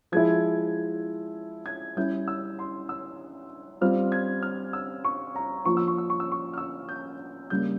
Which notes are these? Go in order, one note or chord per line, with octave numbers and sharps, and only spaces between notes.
F3 G#3 E4 G#6
G#6
G3 C#4 E4 G6
E6
C6
E6
G3 C4 F4 F6
G#6
F6
E6
C#6
A#5
F3 A#3 F4 C#6
E6
C#6
E6
C#6
E6
C#6
F6
E6
G6
C#3 G3 A#3 G6